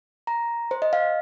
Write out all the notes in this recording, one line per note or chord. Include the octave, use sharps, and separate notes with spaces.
A#5
C5
D#5
F5